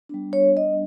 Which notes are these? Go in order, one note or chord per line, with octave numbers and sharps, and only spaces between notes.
G3 B3 D4
C#5
D#5